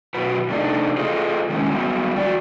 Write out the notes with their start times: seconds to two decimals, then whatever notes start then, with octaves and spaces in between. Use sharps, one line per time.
0.14 F#2 B2 F#4 B4
0.49 C3 A3 D4 D#4
0.98 F4 G#4 A4 C5 D#5
1.49 D#3 G#3 C#4
1.70 F#3 G3 B3
2.16 E2 F#4 D5